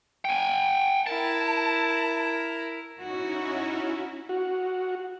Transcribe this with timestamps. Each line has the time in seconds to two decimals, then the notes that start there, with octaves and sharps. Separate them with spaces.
0.25 G5 G#5
1.07 E4 A#4 A5
3.00 C#4 D#4 E4 F#4
4.29 F#4